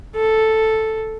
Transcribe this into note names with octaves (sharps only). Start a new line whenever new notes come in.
A4